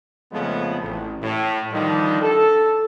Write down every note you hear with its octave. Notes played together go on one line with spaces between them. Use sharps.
F2 C#3 F3 G#3 A3 B3
A1
A2
D3 D#3 F3 G3 D4 D#4
A4